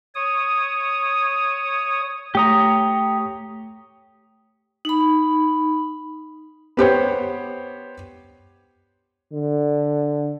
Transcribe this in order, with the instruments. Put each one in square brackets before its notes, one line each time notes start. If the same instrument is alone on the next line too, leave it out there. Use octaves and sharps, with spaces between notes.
[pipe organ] C#5 D#6
[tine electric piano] A3 D#6 [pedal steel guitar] G4 C#5 A#5
[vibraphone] D#4 B5
[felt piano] B3 G4 C5 C#5
[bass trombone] D3